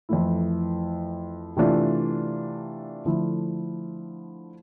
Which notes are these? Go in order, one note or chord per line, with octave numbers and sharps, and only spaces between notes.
F2 E3 A3 E4
C3 E3 A3 D4 F4
D3 F3 A3 E4